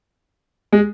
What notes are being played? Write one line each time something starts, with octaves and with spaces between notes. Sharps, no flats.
G#3